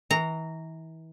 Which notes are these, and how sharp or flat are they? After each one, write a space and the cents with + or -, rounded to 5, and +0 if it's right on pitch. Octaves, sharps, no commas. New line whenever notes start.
E3 -35 A#5 -10